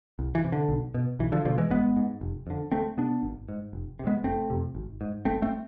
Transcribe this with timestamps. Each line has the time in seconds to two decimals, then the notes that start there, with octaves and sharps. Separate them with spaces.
0.19 C2
0.35 E3
0.44 C3
0.52 D3
0.69 B1
0.94 B2
1.19 B1 E3
1.32 D3 F3
1.45 B2 D3 F3
1.58 E3 G#3
1.70 G#1 G#3 B3
1.96 G#2
2.21 F1
2.47 F2 D3
2.72 D2 A3 C4
2.97 C3 B3 D4
3.23 G#1
3.49 G#2
3.73 F1
3.99 C3
4.04 F2
4.07 G#3 B3
4.24 F1 A3 C4
4.50 F2 C3
4.75 G#1
5.01 G#2
5.25 G#1 A3 C4
5.42 A3 C4